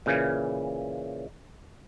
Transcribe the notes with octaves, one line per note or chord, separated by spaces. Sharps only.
A#2 C#3 E3